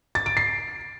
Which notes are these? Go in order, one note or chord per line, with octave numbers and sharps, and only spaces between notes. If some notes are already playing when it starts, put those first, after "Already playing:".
A6
D7
C7